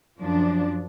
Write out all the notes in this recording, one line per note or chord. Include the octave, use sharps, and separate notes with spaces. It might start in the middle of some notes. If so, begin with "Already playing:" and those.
F#2 F3 D4